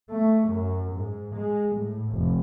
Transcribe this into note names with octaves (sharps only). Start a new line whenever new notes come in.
A3
F#2
G#2
G#3
A2
F1